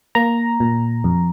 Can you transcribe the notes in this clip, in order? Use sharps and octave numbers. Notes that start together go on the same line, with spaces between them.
A#3 A#5
A#2
F2